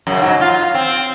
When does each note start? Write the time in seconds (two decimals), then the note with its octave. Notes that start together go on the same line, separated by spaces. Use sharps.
0.07 F#2 C#3
0.22 G#2 F#3
0.41 F4
0.74 C4